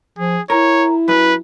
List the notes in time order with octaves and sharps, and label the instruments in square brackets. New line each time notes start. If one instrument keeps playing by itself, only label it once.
[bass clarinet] F3 [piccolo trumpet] G#4
[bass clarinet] E4 [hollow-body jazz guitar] A#4 [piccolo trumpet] C#5
[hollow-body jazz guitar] F#2 [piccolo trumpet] B4